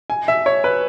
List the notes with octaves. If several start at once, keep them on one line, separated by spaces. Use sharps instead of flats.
G#5
E5
C#5
B4